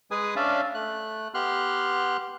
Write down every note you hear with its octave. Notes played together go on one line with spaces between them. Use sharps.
G#3 G#4 B4 G#5 D#6
C#4 D4 D5 E5 F5
A3 F#6
B3 G4 C6 F6 F#6